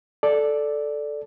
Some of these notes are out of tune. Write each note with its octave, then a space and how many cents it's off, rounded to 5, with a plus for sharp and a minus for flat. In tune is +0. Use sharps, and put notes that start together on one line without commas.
A4 -5 D5 +0